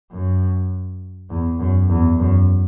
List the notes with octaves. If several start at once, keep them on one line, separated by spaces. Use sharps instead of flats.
F#2
E2
F#2
E2
F#2